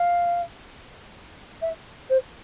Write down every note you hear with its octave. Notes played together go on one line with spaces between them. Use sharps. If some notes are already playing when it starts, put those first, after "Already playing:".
Already playing: F5
E5
C5